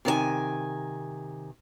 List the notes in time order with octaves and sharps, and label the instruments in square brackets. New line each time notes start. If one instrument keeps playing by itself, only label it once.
[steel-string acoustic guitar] C3 D#3 D5 G#5